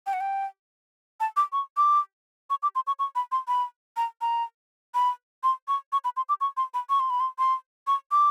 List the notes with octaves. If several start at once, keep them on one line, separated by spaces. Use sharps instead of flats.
G5
F#5
G5
A5
D6
C#6
D6
C#6
D6
C6
C#6
C#6
B5
C6
B5
A#5
A#5
B5
C6
C#6
C#6
B5
C6
D6
C#6
C6
B5
C#6
C6
B5
C6
C6
C#6
D6